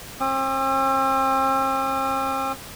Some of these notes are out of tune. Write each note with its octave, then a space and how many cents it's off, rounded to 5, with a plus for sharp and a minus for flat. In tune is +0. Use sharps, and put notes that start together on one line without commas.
C4 +45 D#6 -40